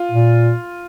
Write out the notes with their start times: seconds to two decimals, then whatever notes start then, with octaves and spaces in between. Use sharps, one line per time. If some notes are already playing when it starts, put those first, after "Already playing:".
Already playing: F4
0.12 A#2